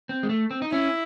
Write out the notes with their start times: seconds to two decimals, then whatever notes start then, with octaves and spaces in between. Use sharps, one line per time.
0.09 C4
0.23 G#3
0.29 A3
0.51 C4
0.62 D#4
0.72 C#4 E4